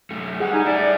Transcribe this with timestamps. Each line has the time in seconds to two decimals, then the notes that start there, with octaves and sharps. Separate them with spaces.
0.11 F#2 A3
0.40 G3 G#4 F#5
0.53 D#4 G#5
0.66 E4 A4 D5